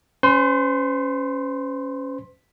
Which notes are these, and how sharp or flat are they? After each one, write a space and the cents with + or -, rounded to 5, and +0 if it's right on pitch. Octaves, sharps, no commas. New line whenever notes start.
C#4 +0 C5 -45 C6 +20